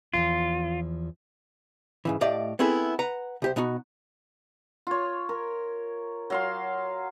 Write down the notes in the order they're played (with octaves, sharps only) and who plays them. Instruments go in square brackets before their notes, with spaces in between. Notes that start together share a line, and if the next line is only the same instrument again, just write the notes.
[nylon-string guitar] E2 G#2 F3 [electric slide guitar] F4
[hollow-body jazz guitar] G#2 C#3 E3
A2 A3 G4 D5 D#5 F5
B3 C4 E4 G#4 A4 B4
B4 F#5 A#5
C2 G4 C5
B2 B3 D#4 F#4
[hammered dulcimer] F4 C#5
A#4
F#3 F5 C6